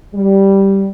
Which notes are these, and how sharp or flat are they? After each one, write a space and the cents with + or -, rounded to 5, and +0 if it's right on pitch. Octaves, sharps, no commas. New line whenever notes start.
G3 -5